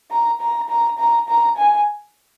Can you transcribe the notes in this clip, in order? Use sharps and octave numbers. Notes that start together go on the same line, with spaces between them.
A#5
A#5
A#5
A#5
A#5
G#5